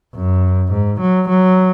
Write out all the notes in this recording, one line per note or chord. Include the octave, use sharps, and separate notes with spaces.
F#2
G#2
F#3
F#3